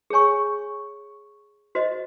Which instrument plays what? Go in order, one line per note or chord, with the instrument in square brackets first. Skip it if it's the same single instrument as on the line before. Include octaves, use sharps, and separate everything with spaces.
[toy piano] G#4 C#5 G#5 C#6
F#4 C5 D#5